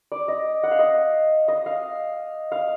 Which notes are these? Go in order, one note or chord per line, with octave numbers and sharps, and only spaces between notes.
D5
D#5
F#5
F5
D#5
D#5
F5
F5